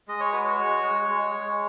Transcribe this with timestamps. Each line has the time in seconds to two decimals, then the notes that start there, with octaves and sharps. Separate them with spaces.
0.08 G#3 D#5
0.20 C#5
0.32 F#4 B4
0.44 C#5
0.59 G#3
0.84 G#3
1.09 G#3
1.34 G#3